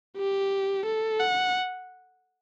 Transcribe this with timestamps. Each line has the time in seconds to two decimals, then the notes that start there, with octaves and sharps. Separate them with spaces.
0.18 G4
0.86 A4
1.20 F#5